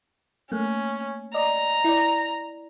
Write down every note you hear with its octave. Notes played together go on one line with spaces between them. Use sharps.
A3 A#3 C#4
D5 D#5 A#5
E4 D5